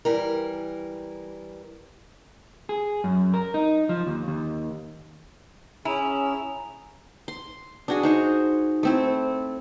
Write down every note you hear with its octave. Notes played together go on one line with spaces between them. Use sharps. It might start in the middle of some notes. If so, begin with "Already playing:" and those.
E3 G3 A#4
G#4
F#2
A#4
D#4
F3
D#2
D#2
C#4 E4 G#4 G#5 A#5 F7
C6
D4 F#4 G#4
D#4 C5 C#6
A3 C4 E4